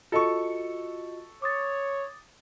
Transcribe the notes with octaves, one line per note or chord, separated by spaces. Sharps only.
F4 F#4 A4 D#5 C#6
C#5 D6 D#6 A6